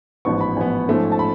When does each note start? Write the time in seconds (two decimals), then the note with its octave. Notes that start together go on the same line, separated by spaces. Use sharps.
0.25 A1 G#2 F3 B3 C#6
0.41 B5
0.57 A1 G#2 F3 B3 G#5
0.88 G#2 F3 A3 C#4
1.12 A5
1.19 B5